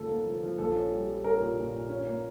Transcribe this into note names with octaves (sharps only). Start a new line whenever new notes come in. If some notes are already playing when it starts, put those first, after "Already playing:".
Already playing: D2 C#3 F3 A#3 A4
A#3
F3
F3
A#1 A4
C#4
G3
G3
C#4 A#4
A#2
A#2
A#2
C#4
A#3